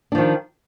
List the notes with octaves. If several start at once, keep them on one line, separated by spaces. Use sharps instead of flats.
D#3 F3 D4